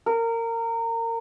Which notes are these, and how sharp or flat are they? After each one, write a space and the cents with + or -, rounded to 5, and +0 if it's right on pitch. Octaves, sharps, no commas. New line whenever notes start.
A#4 -25